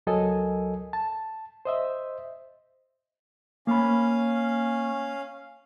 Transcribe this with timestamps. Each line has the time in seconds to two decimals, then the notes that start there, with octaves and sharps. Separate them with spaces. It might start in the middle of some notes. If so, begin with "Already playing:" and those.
0.07 C#2 F#3 A4 A#4 D#5 G#5
0.93 A5
1.65 C5 D#5 E5
3.67 A#3 C#4 F5 B5